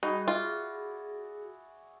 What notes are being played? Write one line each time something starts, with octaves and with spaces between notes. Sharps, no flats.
G3 D#4 F#4 G#4 D#5 B5
F4 F#4 G#4 D5 E5